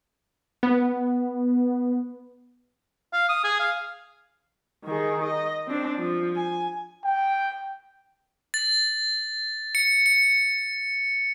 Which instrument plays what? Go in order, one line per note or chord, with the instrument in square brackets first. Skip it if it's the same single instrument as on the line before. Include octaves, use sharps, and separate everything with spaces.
[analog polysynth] B3
[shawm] F5
D#6
G#4
F5
[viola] D#3 G#4
D#5
C4 D4
F3
G#5
[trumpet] G5
[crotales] A6
C#7
C#7